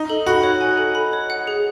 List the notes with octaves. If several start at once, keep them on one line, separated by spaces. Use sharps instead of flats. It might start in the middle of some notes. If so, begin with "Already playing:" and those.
Already playing: D#4
A4
F#4 B5
C#5
G#5
A4
B5
C#5
F#5
G#4